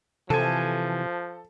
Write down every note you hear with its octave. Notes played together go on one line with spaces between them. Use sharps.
C3 E3 F3 A4 G#5